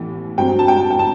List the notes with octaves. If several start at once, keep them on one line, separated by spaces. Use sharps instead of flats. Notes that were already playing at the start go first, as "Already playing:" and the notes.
Already playing: A1 A2 E3 B3
G2 F#3 C4 G5
A5
G5
G5
A5